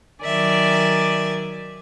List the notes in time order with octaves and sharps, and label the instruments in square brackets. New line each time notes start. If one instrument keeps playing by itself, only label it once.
[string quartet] D#3 F#3 A#4 D5 E5 G#5